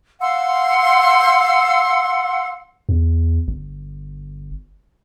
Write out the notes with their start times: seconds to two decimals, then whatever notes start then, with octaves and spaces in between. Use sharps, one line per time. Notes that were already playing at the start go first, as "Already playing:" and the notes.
0.21 F5 F#5 C6 E6
2.89 E2
3.48 G1